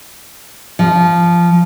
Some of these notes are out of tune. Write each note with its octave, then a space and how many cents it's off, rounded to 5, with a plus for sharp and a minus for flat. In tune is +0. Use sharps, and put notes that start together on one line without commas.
F3 -10